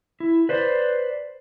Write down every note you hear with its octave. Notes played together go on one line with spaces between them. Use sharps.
E4
B4 C5 D5